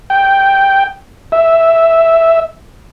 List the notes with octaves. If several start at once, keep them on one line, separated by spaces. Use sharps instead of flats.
G5
E5